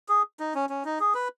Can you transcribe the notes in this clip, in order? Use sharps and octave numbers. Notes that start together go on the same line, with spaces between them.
G#4
D#4
C#4
C#4
D#4
G#4
B4